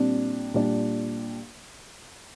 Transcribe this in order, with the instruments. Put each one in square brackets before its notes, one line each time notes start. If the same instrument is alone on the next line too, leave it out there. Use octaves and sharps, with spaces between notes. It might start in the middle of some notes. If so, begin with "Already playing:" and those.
Already playing: [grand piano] A#2 G3 D4 [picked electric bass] C4
[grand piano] A#2 G3 D4